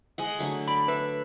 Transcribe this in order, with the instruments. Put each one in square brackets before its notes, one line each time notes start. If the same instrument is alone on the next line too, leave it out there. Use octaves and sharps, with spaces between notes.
[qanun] G#3 D#5 F#5
D3 F#3 A3
[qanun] D5 [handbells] B5
[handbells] B4 [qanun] E5